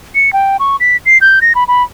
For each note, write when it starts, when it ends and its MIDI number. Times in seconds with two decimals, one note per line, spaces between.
0.15 0.32 97
0.33 0.57 79
0.59 0.76 85
0.80 0.97 95
1.06 1.18 96
1.21 1.39 91
1.42 1.53 94
1.55 1.64 83
1.68 1.83 83